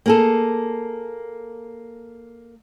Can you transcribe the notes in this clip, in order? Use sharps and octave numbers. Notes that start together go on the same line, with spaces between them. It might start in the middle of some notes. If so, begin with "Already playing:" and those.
A#3 G#4 A4